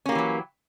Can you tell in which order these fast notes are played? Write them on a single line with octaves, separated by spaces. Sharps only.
C#4 A#3 G4 E3 F#3